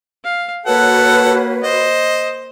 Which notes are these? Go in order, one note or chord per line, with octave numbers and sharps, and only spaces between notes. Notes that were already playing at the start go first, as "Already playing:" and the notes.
F5
A#3 F#4 A4 B4 C#5 F#5
C5 D#5